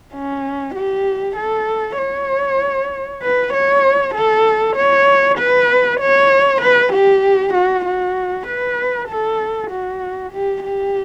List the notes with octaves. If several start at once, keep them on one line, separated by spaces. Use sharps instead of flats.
C#4
G4
A4
C#5
B4
C#5
A4
C#5
B4
C#5
B4
G4
F#4
F#4
B4
A4
F#4
G4
G4